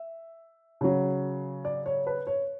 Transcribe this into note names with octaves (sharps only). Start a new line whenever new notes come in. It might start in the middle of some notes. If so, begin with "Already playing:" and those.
Already playing: E5
C#3 F#3
D5
C#5
B4
C#5